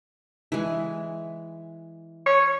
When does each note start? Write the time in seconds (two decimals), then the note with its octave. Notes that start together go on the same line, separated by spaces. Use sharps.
0.52 E3 G#3
2.26 C#5